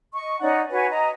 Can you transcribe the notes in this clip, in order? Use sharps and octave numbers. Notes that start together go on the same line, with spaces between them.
D#5 C#6
C#4 D#4 D5 F#5
F#4 B4 C#5 G#5
D#5 A#5